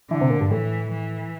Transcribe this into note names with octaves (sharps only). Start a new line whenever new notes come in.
D3 E3
C3
A#2
G2
A2 E3
E3